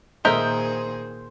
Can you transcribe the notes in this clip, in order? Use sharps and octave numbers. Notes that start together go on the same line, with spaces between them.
A#2 D#3 G#4 A#4 C5 D#5 E5 G6